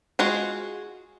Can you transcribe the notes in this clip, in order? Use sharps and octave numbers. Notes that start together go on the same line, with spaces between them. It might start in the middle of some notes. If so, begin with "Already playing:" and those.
G#3 F4 F#4 G#4